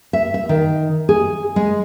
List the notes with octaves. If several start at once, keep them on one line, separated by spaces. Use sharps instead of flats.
E5
E5
D#3
G#4
G#3